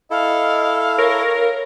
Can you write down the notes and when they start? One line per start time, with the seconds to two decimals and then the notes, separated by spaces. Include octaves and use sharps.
0.11 E4 A4 D#5 F5
0.98 A#4 C#5